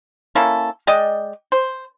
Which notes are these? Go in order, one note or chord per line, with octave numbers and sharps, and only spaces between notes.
A#3 C#4 E4 A4
G#3 D5 D#5 G5
C5